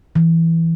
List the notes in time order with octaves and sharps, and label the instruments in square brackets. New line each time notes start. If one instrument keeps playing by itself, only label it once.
[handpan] E3